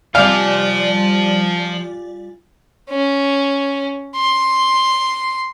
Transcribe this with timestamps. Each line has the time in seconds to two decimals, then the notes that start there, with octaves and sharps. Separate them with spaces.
0.15 F3 G3 F4 D5 F5 G#5
2.90 C#4
4.16 C6